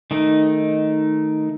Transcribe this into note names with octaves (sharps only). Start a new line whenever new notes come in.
D#3 A3 D#4